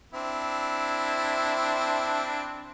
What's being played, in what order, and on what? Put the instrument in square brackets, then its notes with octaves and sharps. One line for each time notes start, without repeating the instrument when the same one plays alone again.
[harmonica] C4 D4 E4